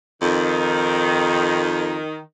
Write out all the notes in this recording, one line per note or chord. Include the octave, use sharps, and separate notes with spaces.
F2 D#3